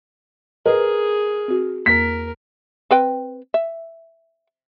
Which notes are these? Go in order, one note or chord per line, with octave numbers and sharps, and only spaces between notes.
G#4 A#4 B4 D#5
C4 F#4
E2 A#3 A#4 B6
C4 B4 G5
E5